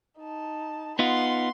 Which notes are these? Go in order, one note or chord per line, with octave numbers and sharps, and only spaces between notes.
D#4 A5
B3 D#4 F4 F#5 C6